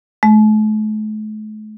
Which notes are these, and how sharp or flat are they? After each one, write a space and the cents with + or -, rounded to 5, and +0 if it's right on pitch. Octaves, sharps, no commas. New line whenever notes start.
A3 -45